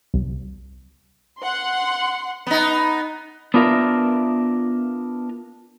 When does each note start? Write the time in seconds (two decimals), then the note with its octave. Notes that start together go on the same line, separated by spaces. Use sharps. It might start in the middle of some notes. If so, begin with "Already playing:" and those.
0.14 C2
1.41 F#5 C6
2.47 B3 D#4
3.54 B3 D4 F4 A#4 E5